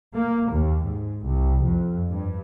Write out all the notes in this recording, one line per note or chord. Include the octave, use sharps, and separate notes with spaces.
A#3
D#2
G#2
C2
F2
G2